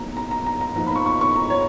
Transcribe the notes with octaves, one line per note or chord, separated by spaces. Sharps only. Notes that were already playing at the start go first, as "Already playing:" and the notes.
Already playing: A#2 F#3 B3 D#4 A#5
A#5
A#5
A#5
A#5
A#2 F3 B3 D#4 A#5
B5
C#6
C#6
C#6
A#5
C#5